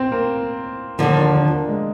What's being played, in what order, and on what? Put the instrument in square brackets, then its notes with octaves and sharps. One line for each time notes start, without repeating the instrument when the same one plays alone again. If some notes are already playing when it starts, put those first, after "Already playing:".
Already playing: [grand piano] C4
A#3
[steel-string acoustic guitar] D#2 D3 F3 [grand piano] A#3
[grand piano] D4
D4
A#3
G#3